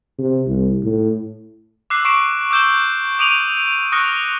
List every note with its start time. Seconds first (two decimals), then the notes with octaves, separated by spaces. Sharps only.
0.18 C3
0.47 C2
0.84 A2
1.90 D6 E6 F#6 C7
2.05 C#6 D6 C7 D7 E7
2.51 D6 E6 G6 E7 G7
3.19 D6 D#6 D7 D#7 F7 F#7
3.57 D7
3.92 C#6 D#6 F6 F#6 A#6 C#7